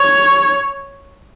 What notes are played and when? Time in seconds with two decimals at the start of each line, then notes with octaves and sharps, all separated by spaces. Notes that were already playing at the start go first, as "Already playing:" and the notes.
Already playing: C#5